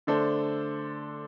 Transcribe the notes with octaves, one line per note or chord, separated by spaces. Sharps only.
D3 A3 D4 A4 C5